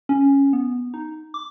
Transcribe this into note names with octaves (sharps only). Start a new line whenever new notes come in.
C#4
B3
D#4
D6